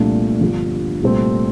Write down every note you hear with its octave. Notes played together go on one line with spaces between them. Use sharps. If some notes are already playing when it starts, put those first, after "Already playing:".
Already playing: C2 A#2 F3 A3 D4
G1 G2 D3 F3
C2 A#2 A3 C4